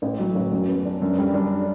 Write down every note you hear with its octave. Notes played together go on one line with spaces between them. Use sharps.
A1
F#3
A1
F#2
B3
D4
F#2
G3
D4